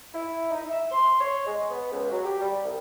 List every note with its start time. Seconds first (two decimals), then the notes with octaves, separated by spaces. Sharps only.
0.13 E4
0.51 D#4
0.69 E5
0.90 C6
1.20 C#5
1.46 G#3
1.70 B3
1.91 C#2
2.10 F#3
2.24 G4
2.40 G3
2.64 C2